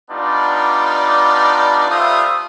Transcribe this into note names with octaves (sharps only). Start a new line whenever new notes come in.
G3 B3 D4 D#4 F4 D5
G3 A3 F4 C5 E5 D#6